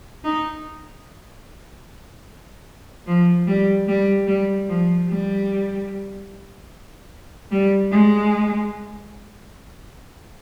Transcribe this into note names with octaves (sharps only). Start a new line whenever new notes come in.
D#4
F3
G3
G3
G3
F3
G3
G3
G#3